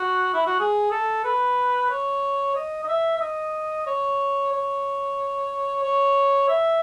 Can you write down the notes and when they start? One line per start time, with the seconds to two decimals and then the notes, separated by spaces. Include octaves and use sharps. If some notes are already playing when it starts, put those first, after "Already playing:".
Already playing: F#4
0.34 E4
0.46 F#4
0.59 G#4
0.91 A4
1.24 B4
1.90 C#5
2.56 D#5
2.83 D#5
2.89 E5
3.17 E5
3.21 D#5
3.87 C#5
4.52 C#5
5.83 C#5
6.49 E5